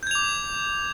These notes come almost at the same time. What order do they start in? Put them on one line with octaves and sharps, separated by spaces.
G6 G#6 F7 D6